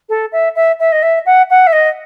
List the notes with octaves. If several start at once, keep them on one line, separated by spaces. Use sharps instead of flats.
A4
E5
E5
E5
D#5
E5
F#5
F#5
E5
D#5